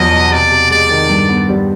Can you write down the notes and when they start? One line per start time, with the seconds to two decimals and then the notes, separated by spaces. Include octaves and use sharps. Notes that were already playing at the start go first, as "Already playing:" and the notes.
Already playing: E2 F3 F#3 B3 D#5
0.12 B2
0.31 C3 D5
0.51 C3
0.71 G#3 D5
0.90 D#3
1.09 G2
1.29 B3
1.49 G3